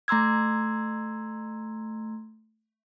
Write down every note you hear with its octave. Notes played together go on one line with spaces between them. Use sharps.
A3 A#5 C6 E6 G#6